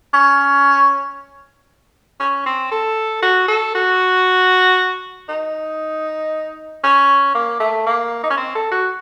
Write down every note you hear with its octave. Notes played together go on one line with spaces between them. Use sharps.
C#4
C#4
C4
A4
F#4
A4
F#4
D#4
C#4
A#3
A3
A#3
D#4
C#4
C4
A4
F#4